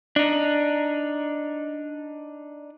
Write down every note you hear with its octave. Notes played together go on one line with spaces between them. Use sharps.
D4 D#4